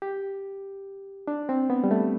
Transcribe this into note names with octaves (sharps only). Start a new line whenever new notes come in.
G4
D4
C4
B3
G3
A3